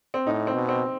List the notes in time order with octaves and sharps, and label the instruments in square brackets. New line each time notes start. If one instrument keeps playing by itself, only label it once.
[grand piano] C4
[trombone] A2 [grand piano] D#4
[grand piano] C4
[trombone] B2
[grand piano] C4